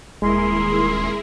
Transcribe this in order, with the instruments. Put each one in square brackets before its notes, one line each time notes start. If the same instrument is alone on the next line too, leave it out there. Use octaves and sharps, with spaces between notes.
[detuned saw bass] D#1 [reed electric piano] G#3 [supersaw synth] E4 G#4 A#4 [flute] C6